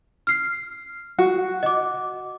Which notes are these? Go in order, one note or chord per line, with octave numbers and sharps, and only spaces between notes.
F6 C7
F#4
D#5 D6